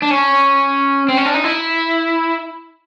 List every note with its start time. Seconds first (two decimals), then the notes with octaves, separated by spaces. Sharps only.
0.02 D4
0.11 C#4
1.09 C4
1.17 C#4
1.25 D4
1.34 D#4
1.44 E4